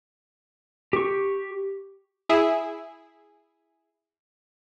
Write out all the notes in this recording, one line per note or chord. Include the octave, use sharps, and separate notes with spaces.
G4 C#6
E4 G#4 E5